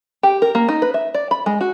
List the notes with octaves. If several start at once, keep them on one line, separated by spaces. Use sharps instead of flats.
G4
A#4
A#3
D#4
B4
E5
D5
B5
G#3
F#4